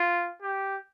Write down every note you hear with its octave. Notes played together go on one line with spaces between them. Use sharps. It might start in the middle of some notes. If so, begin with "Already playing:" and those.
Already playing: F4
G4